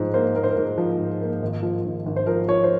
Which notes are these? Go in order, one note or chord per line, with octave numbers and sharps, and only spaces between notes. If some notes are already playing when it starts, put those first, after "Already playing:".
Already playing: G#2 F3 C5
A#3 C5
A#3 A#4
C5
A#4
G#2
F3
G#2
A#3
G#1
F3
G#1
G#1
C5
F3 A#4
F3 C#5
C5